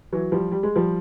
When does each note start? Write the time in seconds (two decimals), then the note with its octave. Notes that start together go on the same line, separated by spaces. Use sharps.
0.13 E3 F#3
0.32 F3 G3
0.52 G3
0.63 G#3
0.76 F3 G3